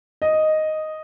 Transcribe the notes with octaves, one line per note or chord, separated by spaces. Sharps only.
D#5